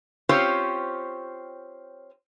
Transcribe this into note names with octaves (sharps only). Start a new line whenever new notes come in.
C4 C#4 F4 G4 C5 C#5